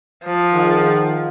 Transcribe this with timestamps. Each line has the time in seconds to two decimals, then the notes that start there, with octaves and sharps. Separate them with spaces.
0.24 F3
0.54 D#3 F4 G#4 F#5